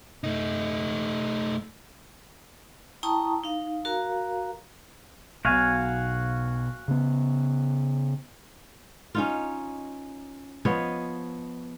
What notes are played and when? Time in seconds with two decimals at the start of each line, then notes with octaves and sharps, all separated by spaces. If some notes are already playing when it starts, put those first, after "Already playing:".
0.24 A3 D#4
3.03 E4 G5 A5 A#5 C#6 D#6
3.44 D#4 F5
3.85 F#4 A#4 F5 A#5
5.45 B1 B2 F#4 F5 G#5
6.88 C#3 B3
9.15 C#4 D#4 F4
10.65 F3 B3 C#5 D#5